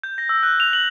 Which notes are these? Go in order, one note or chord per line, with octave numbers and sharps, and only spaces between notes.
G6
A#6
E6
F#6
F7
F#7